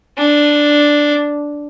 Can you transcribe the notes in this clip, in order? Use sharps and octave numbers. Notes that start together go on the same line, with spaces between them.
D4